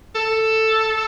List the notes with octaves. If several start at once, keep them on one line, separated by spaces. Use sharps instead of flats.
A4